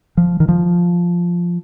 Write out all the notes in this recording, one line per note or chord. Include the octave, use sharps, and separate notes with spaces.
F3
D#3
F3